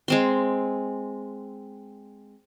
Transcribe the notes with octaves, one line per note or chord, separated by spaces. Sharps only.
G#3 C4 C6